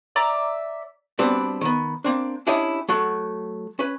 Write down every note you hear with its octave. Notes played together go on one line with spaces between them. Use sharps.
D5 E5 A#5 D6
G3 B3 C4 D4 F#4 B4
D#3 B3
A#3 C4 D4
C#4 D4 E4 G4 C#5 D#5
F#3 A3 F#4
C#4 B4